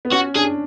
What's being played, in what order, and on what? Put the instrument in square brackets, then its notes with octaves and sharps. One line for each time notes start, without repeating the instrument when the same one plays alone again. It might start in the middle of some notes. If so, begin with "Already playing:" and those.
[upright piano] B3
[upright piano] C#4 [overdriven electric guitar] F#4
[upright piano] D4 [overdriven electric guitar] G#4